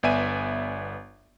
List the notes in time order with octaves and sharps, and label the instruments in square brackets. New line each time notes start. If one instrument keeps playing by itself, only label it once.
[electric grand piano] G1 B3 D5 E5 G#5 D#7